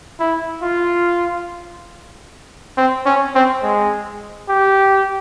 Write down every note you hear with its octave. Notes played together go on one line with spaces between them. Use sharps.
E4
F4
C4
C#4
C4
G#3
G4